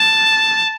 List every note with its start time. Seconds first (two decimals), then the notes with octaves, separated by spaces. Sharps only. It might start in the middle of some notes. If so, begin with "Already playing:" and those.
Already playing: A5